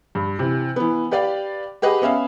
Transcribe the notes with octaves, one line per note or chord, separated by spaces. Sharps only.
G2
C3 E3
E3 B3
G4 B4 D5 F5 G5
G4 G#4 B4 D#5 F#5
B3 C#4 E5 F5